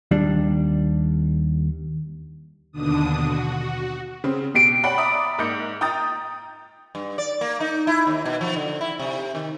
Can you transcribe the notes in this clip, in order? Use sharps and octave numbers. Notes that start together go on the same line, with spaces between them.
D#2 G3 D4
D#2 B2 D3 D4 D#6
F#4
C#3 C4
B2 G4 C7 D7
C#5 D5 F#5 G5 B5
D5 E5 A#5 B5 D6 D#6
G#2 A#3 G6 C#7
G5 A#5 D#6 G6 A6
G2
D5
A#3
D#4
E4
D#2
B2
F3
D3
E4
C3
D#3